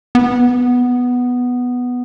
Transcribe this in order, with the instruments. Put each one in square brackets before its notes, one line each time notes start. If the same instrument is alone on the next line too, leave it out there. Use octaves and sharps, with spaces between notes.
[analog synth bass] B3